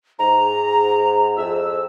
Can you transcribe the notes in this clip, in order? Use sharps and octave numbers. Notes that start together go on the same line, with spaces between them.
G#2 A#5
F2 E6